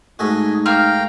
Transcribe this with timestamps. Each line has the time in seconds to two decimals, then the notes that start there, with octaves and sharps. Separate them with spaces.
0.19 G#2 A3 D#4 F#4 D#5 G#5
0.66 A#3 F5 G5 A#5 F6